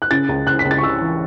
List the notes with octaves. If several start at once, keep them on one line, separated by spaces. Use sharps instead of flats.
F#6
C#3 A6
C#2
C#2 F#6
B6
C#2
A6
C#6
C#3 E6
E3